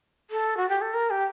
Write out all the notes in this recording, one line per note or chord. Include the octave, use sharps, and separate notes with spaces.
A4
F#4
G4
A4
A#4
G4